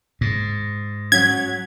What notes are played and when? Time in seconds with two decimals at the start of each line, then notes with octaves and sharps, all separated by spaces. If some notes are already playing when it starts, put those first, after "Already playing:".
0.21 G#2
1.12 F#3 C#4 G#6 B6